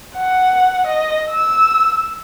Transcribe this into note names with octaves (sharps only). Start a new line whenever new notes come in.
F#5
D#5
E6